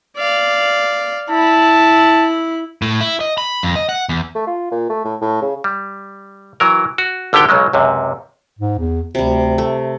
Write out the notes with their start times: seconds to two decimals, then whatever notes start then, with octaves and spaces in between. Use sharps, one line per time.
0.17 D5 F5
1.31 E4 A5 B5
2.82 A2
3.01 E4
3.21 D#5
3.38 B5
3.63 F2
3.76 D#5
3.89 F#5
4.09 E2
4.35 A3
4.47 F4
4.71 A#2
4.90 A3
5.05 A2
5.21 A2
5.41 C#3
5.64 G3
6.60 E3 F#3 A#4
6.98 F#4
7.33 G#1 D3 B3 G4 G5
7.49 B1 C#3 F#3 G#3
7.73 C#2 F#2 C3
8.59 G#2
8.78 E2
9.15 D2 C3 G3
9.58 A3